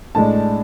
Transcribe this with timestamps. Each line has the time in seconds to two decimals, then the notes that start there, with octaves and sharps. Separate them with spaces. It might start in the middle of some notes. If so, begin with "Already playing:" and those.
0.15 A2 G#3 D4 A5